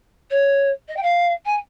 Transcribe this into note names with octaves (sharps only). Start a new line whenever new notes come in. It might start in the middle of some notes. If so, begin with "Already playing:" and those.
C#5
D#5
G5
F5
G#5